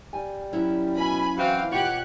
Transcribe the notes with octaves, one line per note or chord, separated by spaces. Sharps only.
G3 G#5
F#3 C#4 E4
B2 G#5 B5
E3 C4 F#4 F5
B2 F4 G4 C#5 F#5 F#6